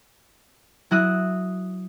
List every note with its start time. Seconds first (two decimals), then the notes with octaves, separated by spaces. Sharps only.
0.91 F#3 E4 F#4 D#6 F#6